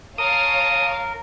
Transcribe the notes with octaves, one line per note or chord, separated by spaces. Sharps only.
A#4 C#5 F5 A5 D#6